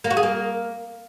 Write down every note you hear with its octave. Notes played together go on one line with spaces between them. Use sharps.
A#3
F#4
G#4
A#3